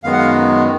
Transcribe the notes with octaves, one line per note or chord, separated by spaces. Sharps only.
F#2 D#3 G#3 B3 F5
F#5
F5